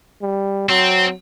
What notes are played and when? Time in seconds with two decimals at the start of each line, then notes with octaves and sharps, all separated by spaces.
0.22 G3
0.69 F#3 C4